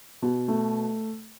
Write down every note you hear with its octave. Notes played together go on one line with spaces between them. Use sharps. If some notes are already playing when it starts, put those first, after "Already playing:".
B2
A3